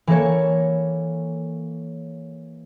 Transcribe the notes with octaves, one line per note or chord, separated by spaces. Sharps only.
E3 A#3 A4 C#5